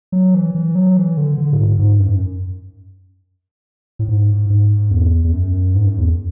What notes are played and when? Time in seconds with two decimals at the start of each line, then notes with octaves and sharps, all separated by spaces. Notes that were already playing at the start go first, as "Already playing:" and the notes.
0.12 F#3
0.34 E3
0.55 E3
0.75 F#3
0.97 E3
1.17 D3
1.38 D3
1.53 A2
1.59 G#2
1.79 G#2
2.00 F#2
3.99 A2
4.08 G#2
4.50 G#2
4.91 E2
5.24 E2
5.32 F#2
5.74 G#2
5.86 F#2
5.98 E2